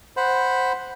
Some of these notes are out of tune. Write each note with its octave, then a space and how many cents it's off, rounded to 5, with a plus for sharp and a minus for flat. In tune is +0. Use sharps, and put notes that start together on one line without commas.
C5 +0 F#5 +0 B5 +0